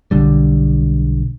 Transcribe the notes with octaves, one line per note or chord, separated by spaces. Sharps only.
B1 D3 G3